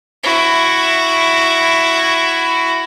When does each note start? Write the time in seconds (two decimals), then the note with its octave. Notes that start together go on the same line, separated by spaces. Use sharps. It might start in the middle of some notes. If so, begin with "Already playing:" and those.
0.23 E4 F#4